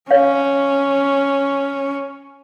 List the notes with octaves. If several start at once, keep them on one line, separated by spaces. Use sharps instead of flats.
C#4 C#5 F5